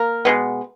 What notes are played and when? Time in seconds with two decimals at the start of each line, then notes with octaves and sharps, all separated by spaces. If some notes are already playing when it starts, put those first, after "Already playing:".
Already playing: A#3 A#4
0.25 B2 G#3 B3